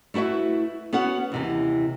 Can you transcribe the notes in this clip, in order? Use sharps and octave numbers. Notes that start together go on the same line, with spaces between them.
A3 E4 F#4 B4 E5
B3 C#4 F#4 B4 F#5
D#2 C3 E3